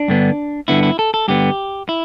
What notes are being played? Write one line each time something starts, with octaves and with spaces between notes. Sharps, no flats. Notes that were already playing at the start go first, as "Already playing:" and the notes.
Already playing: D4
G2 D3 B3
G2 D3 B3 E4
E4
A4
A4
G2 D3 B3 G4
E4